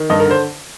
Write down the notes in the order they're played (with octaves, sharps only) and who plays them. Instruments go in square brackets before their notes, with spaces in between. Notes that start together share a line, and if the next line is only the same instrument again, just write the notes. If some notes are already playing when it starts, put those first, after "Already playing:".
Already playing: [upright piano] D#3
G2 D#5
A#4
D3
C5